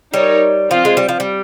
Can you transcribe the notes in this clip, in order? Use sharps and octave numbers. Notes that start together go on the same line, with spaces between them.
G3 D#4 A#4 C#5
F3 C4 F4 C5
G#3
G3
F3
G3